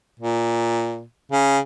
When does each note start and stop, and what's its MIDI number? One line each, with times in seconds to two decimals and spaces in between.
0.19 1.03 46
1.32 1.58 49